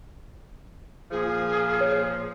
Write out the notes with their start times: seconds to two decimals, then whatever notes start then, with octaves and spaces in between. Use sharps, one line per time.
1.11 A#2 F3 G#4
1.81 C#5